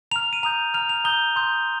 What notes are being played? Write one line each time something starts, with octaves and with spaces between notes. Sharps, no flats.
A#5 F6 F7
D#7
A#5 D#6 G6 F7
A#5 F6 F7
F7
A#5 D#6 G6 G7
C6 D#6 G6